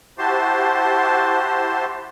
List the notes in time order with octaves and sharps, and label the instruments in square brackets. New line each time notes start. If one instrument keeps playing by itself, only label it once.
[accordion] E4 F#4 G4 C5 A5 C6